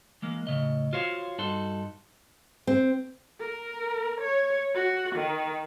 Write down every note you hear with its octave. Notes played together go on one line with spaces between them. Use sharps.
E3 G#3 A#3
A2 C#3 D#5
F4 F#4 C5 C#5 F5
G2 D#4 F#4 A4 C6
C4
A#4
C#5
F#4
D#3